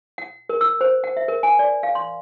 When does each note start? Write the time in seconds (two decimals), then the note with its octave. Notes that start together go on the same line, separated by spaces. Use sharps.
0.18 F#5
0.49 A#4
0.61 E6
0.81 C5
1.04 F#5
1.17 E5
1.28 A#4
1.43 G#5
1.59 D5
1.83 F5
1.95 C6